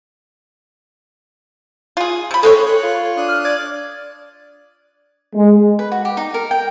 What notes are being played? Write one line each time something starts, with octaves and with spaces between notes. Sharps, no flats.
F4 G#4
C3 B5
G#3 C4 A4 C#5
C#5 F#6
F4
C#5
D4 D#6 F#6
F6
D5 G#6
G#3
B4
F#4
G4
D#4
A#4
G5